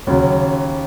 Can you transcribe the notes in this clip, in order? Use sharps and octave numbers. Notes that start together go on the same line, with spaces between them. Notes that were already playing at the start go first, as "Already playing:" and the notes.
D#2 C#3 F#3